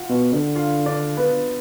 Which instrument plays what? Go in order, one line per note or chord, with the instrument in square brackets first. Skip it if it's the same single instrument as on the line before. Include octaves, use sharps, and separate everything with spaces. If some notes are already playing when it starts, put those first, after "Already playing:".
Already playing: [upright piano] F4 F#5
[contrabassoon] B2
D3
[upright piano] F4 F5
D4 D5
B3 B4